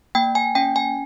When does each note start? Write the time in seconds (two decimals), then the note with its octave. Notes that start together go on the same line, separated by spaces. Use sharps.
0.15 A#3 G5
0.35 G#5
0.55 C#4 G5
0.76 G#5